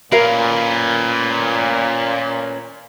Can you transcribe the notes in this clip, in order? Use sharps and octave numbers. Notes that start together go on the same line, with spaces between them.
A#2 C#4 A#4 B4 F5